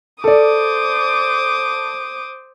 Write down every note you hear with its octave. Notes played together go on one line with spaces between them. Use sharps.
A4 C5 D5 D6 D#6